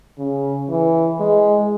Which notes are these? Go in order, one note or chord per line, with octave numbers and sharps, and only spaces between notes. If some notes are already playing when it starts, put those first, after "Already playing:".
C#3
E3
G#3